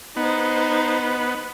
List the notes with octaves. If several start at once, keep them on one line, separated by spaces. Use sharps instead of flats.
B3 D#4 C5